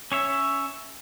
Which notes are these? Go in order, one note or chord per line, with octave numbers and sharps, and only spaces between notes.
C#4 C#5 E5